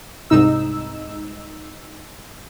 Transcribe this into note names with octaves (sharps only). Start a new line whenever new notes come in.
C2 G#2 D#4 E6